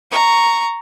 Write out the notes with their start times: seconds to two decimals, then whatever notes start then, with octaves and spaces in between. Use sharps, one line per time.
0.11 A#5 C#6